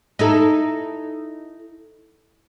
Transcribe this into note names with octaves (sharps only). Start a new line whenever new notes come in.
D#4 E4 A4